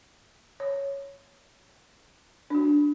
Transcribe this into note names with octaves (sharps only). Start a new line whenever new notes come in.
C#5
D4 F#4